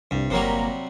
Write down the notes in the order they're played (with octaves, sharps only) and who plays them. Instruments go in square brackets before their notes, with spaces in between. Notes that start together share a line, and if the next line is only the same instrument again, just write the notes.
[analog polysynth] C2 [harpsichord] G2
[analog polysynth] G1 A#3 A#5 [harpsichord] C3 F#3 G3